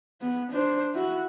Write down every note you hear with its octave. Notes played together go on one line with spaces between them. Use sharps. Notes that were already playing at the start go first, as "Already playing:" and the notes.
B3
D4 C5
E4 F#4